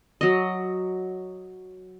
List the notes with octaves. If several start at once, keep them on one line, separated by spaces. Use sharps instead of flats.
F#3 D#5